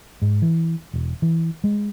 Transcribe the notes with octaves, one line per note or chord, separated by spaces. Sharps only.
G#2
E3
E1
E3
G#3